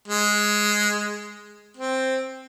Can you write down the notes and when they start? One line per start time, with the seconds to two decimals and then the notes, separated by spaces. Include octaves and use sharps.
0.08 G#3
1.77 C4